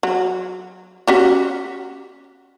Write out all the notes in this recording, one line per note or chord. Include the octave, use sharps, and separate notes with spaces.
F#3
C#4 F#4 G4